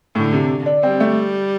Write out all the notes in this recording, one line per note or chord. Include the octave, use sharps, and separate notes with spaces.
A2 D3
C3
D4
G3 C4
A3